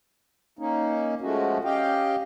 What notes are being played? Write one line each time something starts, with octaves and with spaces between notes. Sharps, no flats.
A#3 C#4 D#4
F3 G#3 A3 C#4 F#4
C#4 G4 D#5 F5 G5